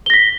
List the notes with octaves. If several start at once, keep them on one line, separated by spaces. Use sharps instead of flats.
A#6 B6 G7